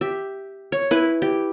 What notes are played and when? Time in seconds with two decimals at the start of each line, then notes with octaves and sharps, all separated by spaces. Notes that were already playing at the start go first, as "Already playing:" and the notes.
0.01 G4 E5
0.72 C#5
0.91 E4 B4 G#5
1.22 G4